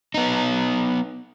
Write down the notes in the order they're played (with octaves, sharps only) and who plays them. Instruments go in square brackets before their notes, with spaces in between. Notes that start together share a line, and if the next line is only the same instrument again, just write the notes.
[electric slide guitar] B3 D#4